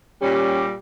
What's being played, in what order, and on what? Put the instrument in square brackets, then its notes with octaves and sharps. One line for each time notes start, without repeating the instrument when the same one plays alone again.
[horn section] A#2 G3 [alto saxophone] C#4 [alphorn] G4